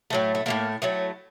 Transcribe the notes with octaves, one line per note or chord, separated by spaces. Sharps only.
A2 F#3 A3
A3
A2 F#3 A3 A#3
A2 F#3 A3